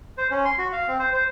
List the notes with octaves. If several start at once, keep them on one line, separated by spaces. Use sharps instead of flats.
C5
C#4
C6
F#4
F5
C4
C5
C5